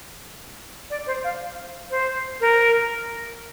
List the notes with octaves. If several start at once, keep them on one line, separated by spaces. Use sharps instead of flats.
D5
C5
F5
C5
A#4